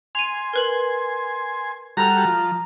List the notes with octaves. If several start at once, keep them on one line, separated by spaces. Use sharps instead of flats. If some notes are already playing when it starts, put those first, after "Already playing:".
G#5 C6 D#7 F7
A#4 B4 F#7
G3 F#4 A4 A#5 F6
F3